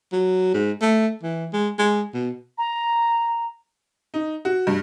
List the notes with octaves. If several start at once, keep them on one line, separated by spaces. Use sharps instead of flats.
F#3
G#2
A3
E3
G#3
G#3
B2
A#5
D#4
F#4
G2